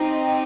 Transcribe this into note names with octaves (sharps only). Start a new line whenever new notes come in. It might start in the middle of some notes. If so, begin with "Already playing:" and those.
Already playing: C4 D#4 G4